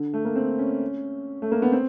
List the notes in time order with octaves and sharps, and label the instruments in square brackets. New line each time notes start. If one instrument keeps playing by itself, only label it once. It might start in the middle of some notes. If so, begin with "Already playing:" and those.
Already playing: [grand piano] D3
A3
A#3
C4
C#4
A3
A#3
B3
C4